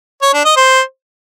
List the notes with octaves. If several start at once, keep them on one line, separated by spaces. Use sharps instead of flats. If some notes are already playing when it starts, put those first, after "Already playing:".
C#5
D4
D#5
C5